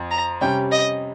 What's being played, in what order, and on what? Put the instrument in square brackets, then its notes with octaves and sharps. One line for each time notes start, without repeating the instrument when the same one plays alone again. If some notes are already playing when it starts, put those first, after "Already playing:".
Already playing: [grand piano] F2
[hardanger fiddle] A#5
[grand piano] C3 G3 C#4 [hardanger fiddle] G5
[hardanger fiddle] D#5